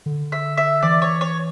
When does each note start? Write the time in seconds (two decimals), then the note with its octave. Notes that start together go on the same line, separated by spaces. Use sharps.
0.06 D3
0.32 E5
0.57 E5
0.82 E3 D5
1.02 C#5
1.21 C#5